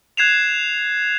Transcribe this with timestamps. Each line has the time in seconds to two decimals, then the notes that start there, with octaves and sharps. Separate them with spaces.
0.17 F#6 G#6 C7 E7 F7